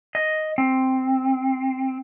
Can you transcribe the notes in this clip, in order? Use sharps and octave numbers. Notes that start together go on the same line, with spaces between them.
D#5
C4